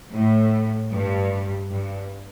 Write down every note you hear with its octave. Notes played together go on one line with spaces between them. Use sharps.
A2
G2
G2